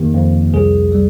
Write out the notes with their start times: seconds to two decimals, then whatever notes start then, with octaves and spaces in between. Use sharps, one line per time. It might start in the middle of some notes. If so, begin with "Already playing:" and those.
Already playing: F2 D#3 A#3 G4
0.15 F2
0.53 C2 G#4
0.92 G3